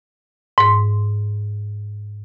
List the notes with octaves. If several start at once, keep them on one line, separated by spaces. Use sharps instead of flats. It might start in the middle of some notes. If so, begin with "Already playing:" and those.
G#2 C6